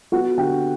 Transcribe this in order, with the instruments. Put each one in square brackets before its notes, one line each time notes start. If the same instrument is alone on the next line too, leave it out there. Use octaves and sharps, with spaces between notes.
[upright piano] B3 F#4 F#5
D3 G4 G5